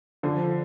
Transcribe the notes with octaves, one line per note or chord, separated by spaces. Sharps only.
D3 F3